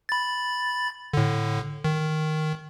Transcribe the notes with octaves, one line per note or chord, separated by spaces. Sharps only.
B5 A6
A2 D3
D#3